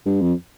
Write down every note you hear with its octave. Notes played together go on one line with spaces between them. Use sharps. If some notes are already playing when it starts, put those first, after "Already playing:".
G2
F2